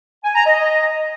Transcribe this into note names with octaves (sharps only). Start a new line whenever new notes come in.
G#5
A#5
D#5